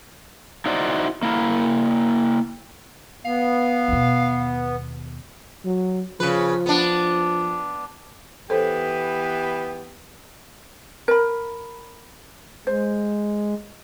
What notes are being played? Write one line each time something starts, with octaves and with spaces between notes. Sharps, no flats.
D#4 E4 F#4 C5 D5
A#3 E4
B3 F5
D#2 B2
F#3
C#3 F3 B4
B3 D4
E3 B3 G4 A4 C5
A#4 B5
G#3 C5